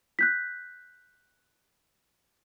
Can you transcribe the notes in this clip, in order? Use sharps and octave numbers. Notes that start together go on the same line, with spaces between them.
F#6 G6 B6